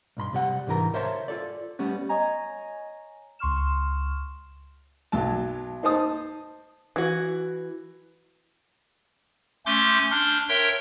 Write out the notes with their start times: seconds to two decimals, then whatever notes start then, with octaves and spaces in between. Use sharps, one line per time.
0.17 B1 G2 B5 C6
0.33 C3 G3 F#5
0.67 C2 G#2 D3 E3 A#4 A#5
0.94 A#4 C5 C#5 E5 A5 C6
1.28 F4 A4 D5
1.79 G3 A3 B3 C#4 B4
2.09 C#5 D#5 G#5 A#5
3.39 C#2 C6 C#6 F6 E7
5.12 B1 F#3 A5
5.83 D#4 C5 A5 D#6
6.96 E3 F#4
9.66 A3 C#4 C6 D6 G6
10.11 D4 C6 F6 G6
10.49 A#4 C#5 E5 G5 C6